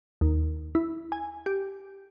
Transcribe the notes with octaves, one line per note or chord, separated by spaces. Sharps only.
D#2
E4
G#5
G4